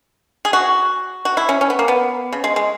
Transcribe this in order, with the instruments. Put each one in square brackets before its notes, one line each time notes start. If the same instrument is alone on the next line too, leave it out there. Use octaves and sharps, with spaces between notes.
[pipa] G#4
F#4
F#4
E4
C#4
C#4
B3
A#3
B3
C#3
G#3
G#3